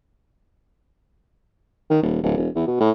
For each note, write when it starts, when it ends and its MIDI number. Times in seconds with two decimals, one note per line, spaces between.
1.90 2.02 51
2.02 2.21 27
2.23 2.36 26
2.37 2.48 28
2.56 2.65 40
2.67 2.78 47
2.80 2.91 45